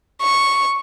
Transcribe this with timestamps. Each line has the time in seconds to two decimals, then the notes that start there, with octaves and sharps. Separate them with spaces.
0.22 C#6